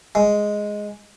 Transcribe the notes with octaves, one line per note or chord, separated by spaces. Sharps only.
G#3